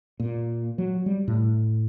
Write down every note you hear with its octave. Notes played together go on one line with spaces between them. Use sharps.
A#2
F#3
G3
A2